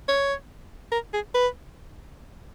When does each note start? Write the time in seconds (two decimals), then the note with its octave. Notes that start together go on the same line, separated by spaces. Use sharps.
0.08 C#5
0.92 A#4
1.13 G#4
1.34 B4